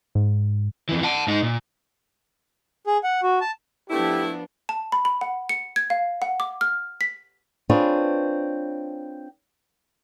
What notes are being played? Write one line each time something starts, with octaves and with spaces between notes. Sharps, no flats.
G#2
F2 E3
F#5 A5
G#2 D#4
A#2
G#4
F#5
F#4
A5
F3 A3 B3 D4 E4 G4
A5
B5
B5
F#5
C#7
G#6
F5
F#5
D6
F6
B6
C4 D4 F4 G#4 B4 C#5